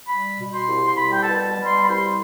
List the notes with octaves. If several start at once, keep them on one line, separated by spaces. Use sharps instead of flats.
G3 B5
B2
C6
C2
C6
G3 B5
G5
A5
B2
A5
G3
C6
B5
C2 C6